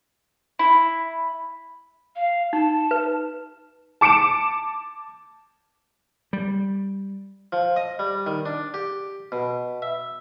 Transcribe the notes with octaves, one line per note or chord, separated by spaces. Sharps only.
E4
F5
D#4 A5
B4
A5 D6 C#7 D7 E7
G3
F3
D#5
G3
D#3
D4
G4
B2
E5